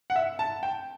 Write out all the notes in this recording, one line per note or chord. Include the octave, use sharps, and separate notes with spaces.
F#5
E5
A5
G5